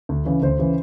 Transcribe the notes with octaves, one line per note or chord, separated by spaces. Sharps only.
D2
C#3 E3
D2 C5
C#3 E3